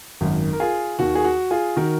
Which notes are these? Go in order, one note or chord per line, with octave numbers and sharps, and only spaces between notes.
G#1 F#2 D#3
A#4
F4 G#4
D#2 D#3 F#4
G#4
F#4
F4 G#4
D#3 F#4 A#4